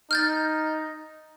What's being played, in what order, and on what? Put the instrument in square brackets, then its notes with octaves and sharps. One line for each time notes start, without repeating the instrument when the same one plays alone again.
[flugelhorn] D#4 [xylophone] F6 G6 A6